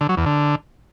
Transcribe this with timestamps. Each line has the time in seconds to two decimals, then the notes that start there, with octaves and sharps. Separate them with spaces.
0.01 D3
0.09 F#3
0.17 E2
0.26 D3